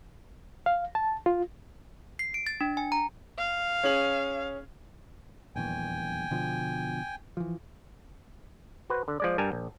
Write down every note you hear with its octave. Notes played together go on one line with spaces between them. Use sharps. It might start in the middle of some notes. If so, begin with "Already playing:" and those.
F5
A5
F4
C7
D7
A6
D4
G#5
A#5
F5
C#4 G#4 F#7
D#1 A#1 E2 G5 G#5
B2 D3 F3
E3 F3
F#4 B4 C5
D3
F3 G#3 D5
G2 G3 A#4 G#5 A5
A#1